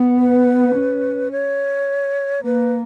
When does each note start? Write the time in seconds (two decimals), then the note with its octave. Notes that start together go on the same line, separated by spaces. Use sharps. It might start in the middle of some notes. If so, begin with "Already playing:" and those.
Already playing: B3
0.19 B4
0.75 C#4
1.32 C#5
2.44 A#3 B4